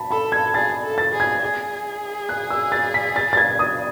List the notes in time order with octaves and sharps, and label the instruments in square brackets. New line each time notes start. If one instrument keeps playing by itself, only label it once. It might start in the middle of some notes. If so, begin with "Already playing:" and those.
Already playing: [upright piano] A5 B5
[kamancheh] A4 [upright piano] B5
[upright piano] G#6
[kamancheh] G#4 [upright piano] A6
[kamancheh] A4
[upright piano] A6
[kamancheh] G#4
[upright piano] G#6
[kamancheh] G#4
[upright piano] F#6
E6
A6
B6
A6
A6
G#6
D#6